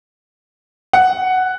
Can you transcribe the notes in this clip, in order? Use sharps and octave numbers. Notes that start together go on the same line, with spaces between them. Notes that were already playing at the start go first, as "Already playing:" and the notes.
F#5